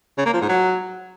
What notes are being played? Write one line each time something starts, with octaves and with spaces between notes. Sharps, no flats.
C#3
A#3
F3
G#2
F#3